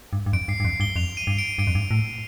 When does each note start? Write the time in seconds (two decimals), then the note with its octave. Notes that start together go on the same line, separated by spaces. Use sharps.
0.13 G2
0.26 G2
0.33 F2 D7
0.48 G2 C7
0.60 G2
0.65 F2 C7
0.80 G2 G7
0.96 F2 F7
1.17 D#7
1.27 G2
1.38 D7
1.58 G2 D7
1.67 F2
1.75 G2
1.91 A2